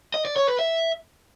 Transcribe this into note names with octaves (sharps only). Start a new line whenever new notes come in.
D#5
D5
C#5
B4
E5